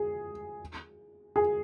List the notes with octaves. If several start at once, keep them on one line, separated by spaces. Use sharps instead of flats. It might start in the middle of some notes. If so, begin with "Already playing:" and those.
Already playing: G#4
G#4